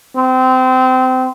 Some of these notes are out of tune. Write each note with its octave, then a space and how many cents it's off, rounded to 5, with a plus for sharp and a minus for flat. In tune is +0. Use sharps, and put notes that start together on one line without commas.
C4 -25